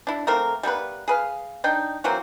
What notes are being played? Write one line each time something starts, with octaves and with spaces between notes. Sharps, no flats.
D4 E4
A3 A#3 C4 A#4
G3 A#3 B3 B4
G#4 B4 F5
D4 D#4 G5
E3 F#3 A#3 C4